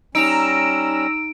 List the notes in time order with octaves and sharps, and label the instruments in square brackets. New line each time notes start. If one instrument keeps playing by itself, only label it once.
[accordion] G3 C#4 [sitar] D#4 [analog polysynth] A#5 E6 [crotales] D7